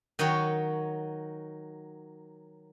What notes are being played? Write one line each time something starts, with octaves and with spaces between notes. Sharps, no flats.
D#3 F#3 D#4 F#4 C#5